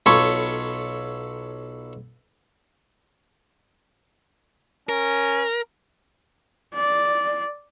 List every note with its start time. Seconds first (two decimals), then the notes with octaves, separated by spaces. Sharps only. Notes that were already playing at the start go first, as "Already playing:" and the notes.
0.06 B1 F4 A4 C#5 B5 C#6
4.89 C#4 A#4
6.74 D5